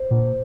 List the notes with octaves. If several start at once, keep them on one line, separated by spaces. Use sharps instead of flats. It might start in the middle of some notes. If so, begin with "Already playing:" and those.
Already playing: C5
A#2